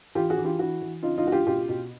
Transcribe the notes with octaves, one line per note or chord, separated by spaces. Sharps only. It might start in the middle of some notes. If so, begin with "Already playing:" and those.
E3 F4 G4
F#4 G#4
E3
F4 G4
E3 E4 F#4
E3
C#3 D#4 F4
D#4 F4
C#2 F#4
F4 G4
B2 F4 G4
B2